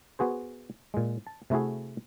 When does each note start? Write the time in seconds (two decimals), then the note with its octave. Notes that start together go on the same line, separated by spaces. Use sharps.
0.19 B3 F#4 G#4 C5
0.94 A#2 G#3
1.27 A5
1.50 C3 A3 E4 F#4 G#4